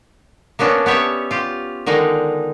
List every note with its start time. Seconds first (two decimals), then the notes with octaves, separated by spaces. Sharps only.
0.59 A#3 B3 C#4 D4
0.86 B3 G4 C#5 E5
1.31 F4 G4
1.86 D3 D#3 G#3 D#4